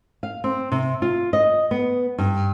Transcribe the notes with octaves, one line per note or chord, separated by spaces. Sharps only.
F5
C4
C3
F4
D#5
B3
G2